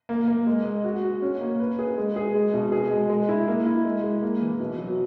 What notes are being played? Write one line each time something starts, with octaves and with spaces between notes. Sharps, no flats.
A#3
A#3
G#3
G#3
F#4
F#4
C#4
A#3
B4
G#4
G#3
G#4
G#3
B2
G#4
G#3
G#3
E4
A#3
E4
G#3
G#3
A#3
E3
B2
F#3